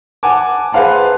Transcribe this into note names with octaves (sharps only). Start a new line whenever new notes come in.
F#5 G#5 A5 D6
G#4 B4 C5 F5 F#5 A5